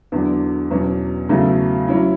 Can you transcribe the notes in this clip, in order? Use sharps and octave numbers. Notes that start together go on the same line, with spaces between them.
E2 D3 F#3
E2 B2 F#3 C#4
E2 C#3 F#3 A3
F#3 C#4 E4